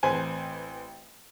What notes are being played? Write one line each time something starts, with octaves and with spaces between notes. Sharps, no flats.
A1 C4 B4 C5 G#5